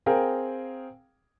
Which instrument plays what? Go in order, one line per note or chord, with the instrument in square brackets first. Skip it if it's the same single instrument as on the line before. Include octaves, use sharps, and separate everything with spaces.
[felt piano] C4 G#4 A#4 F5 G5